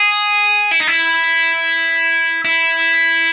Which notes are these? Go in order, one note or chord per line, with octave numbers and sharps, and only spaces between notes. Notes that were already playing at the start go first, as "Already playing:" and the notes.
Already playing: G#4
E4
D#4
E4
E4